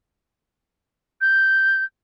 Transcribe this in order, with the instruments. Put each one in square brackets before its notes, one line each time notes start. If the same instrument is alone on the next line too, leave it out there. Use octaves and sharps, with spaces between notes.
[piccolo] G6